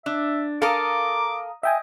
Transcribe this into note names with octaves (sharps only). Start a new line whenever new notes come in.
D4 E5
A4 A#4 F5 A#5 D6 D#6
D#5 E5 G5 G#5